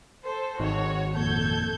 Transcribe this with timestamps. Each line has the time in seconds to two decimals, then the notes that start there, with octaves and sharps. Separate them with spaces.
0.22 A4 C5
0.60 G#1 D#3 F#4 C#5
1.16 F2 A#2 A4 G6 G#6